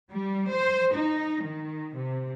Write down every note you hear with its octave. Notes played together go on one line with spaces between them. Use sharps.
G3
C5
D#4
D#3
C3